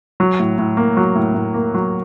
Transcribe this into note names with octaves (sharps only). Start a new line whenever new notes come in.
F#3
A2
A2
A#3
F#3
A2
A2
A#3
F#3